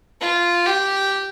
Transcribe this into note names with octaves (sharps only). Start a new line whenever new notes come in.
F4
G4